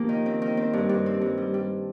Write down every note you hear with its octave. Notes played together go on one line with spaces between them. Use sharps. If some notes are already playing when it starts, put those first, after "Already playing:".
Already playing: F3 A#3 G4
D#3
C4
D#3
C4
G2
G2
C4
G2
G3
G3